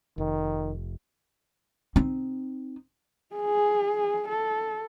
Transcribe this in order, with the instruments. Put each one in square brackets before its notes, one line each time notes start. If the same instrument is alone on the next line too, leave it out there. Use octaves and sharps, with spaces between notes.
[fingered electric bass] F1 [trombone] D#3
[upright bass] C4 D#4
[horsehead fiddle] G#4
A4